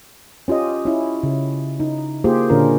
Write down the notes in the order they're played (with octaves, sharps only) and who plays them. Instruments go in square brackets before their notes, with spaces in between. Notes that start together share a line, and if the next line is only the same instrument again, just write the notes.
[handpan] C#4 F4 G4 D#5
C#4 E4
C#3
D#4
A#3 F4 G4 G#4 C5
A#2 D3 C#4 D4 F4 A#4